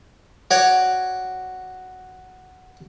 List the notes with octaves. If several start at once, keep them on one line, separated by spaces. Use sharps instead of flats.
F#4 C#5 D5